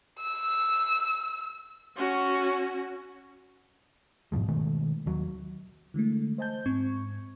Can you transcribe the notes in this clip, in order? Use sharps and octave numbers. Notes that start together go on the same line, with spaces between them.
E6
C#4 F#4
G#2 B2 F3 G#3
B2 D#3 G#3 A3
D#2 F#3
D3 E3 G#3 A3
C5 D#5 G#5 A5 G6
G#2 C4 C#6 G#6